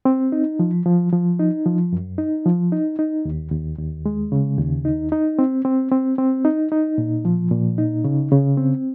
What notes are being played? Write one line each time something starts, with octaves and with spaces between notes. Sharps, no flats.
C4
D#4
F3
F3
F3
D#4
F3
F#2
D#4
F3
D#4
D#4
D#2
D#2
D#2
G#3
C#3
D#2
D#4
D#4
C4
C4
C4
C4
D#4
D#4
A#2
F3
A#2
D#4
C#3
C#3
C4